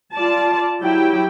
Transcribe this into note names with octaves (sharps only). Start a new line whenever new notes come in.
F4 D5 A5
F#3 E4 G4 G5